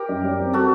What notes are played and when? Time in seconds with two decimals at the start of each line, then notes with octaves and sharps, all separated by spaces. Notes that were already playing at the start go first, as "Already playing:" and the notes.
Already playing: G4 A#4
0.09 F#2
0.23 G3
0.39 C4
0.53 G3 F#4 A4